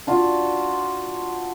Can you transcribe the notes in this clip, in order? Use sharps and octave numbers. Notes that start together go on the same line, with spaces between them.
D4 F4 F#4